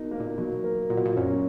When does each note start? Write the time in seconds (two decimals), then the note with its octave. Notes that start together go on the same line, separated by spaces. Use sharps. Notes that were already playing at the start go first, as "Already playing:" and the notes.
Already playing: B2 D#4 A#4
0.11 A#3
0.20 A#2
0.38 B2 F#3
0.64 A#4
0.90 A#2 F#4
0.97 B2
1.06 A#2
1.16 F#2 C#4